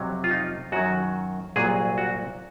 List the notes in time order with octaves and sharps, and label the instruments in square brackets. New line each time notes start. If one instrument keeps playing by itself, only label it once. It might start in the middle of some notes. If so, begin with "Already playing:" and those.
Already playing: [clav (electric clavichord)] F2 C3 F#3
F4
D#4
F#2 D#3 F#3 F#4
C2 A#2 F#3 G#4
F#4